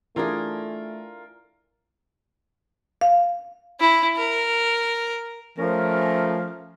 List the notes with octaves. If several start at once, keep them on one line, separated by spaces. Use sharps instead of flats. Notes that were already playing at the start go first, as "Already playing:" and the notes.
E3 A3 D4 F4 G#4 A#4
F5
E4
A#4
F3 A3 C#4 A#4